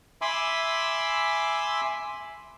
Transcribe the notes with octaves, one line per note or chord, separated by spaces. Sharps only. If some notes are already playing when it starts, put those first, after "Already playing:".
E5 G#5 B5 C6 D6 E6